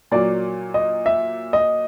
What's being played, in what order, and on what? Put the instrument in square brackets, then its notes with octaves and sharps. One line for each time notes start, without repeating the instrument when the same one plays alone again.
[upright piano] A#2 F#3 A#3 [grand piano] D5
[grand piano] D#5
E5
D#5